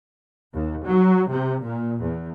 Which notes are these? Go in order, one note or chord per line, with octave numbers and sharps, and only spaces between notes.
D#2
F#3
C3
A#2
E2